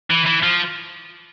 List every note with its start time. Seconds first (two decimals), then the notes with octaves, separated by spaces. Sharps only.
0.10 E3
0.26 E3
0.43 F3